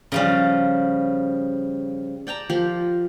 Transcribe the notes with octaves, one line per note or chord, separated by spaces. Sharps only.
C#3 F3 G3
D5 G5 A5 A#5
F3 G4 A#4